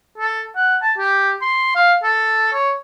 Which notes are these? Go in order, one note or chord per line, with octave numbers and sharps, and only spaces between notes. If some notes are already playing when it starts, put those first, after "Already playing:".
A4
F#5
A5
G4
C6
F5
A4
C#5